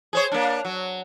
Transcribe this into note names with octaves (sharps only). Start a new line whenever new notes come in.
G#4 C5 C#5
A#3 D4
F#3